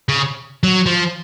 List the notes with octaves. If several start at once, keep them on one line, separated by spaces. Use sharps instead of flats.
C#3
F#3
F3